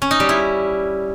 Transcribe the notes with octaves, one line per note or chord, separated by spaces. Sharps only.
C#4
D#4
G3
E4